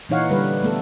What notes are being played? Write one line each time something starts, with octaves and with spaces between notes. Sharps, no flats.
A#2 E3 D#4 C#5 F5 F#5
D3 G3 B4
A3 B3 A4